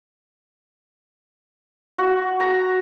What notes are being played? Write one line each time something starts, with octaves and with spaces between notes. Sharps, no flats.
F#4
A#5